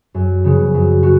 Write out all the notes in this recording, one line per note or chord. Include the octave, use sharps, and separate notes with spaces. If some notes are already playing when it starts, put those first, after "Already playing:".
F#2
C#3 F3 B3 F#4
F#2
B3 F#4